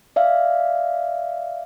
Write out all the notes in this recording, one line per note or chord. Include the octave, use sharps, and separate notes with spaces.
D5 E5 F5